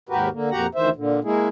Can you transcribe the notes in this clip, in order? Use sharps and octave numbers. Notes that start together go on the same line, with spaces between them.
D#2 G#2 F#4 G4 A#4 B4
D3 A#3
F2 A#2 F#4 G4 F#5 A#5
D2 D#3 E3 C5 E5
A#2 D3
G#3 A#3 E4 G#4